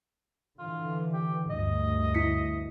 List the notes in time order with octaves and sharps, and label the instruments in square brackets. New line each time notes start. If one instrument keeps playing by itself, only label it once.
[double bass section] D3 E3 [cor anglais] F4
[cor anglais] G4
[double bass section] D2 G2 [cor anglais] D#5
[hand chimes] E4 B6 C#7